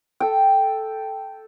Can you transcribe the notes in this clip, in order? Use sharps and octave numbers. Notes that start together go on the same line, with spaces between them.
A4 G5